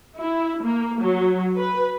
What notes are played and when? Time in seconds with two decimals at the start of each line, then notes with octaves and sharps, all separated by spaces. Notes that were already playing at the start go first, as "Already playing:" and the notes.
0.18 E4
0.63 A#3
1.01 F#3
1.59 B4